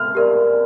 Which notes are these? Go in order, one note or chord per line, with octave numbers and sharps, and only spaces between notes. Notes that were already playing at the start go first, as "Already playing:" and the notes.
Already playing: F6
G4 A#4 D5